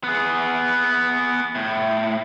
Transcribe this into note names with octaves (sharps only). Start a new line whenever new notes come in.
B3 G#4
A2